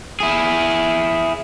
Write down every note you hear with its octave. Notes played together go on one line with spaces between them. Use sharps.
E4 G#4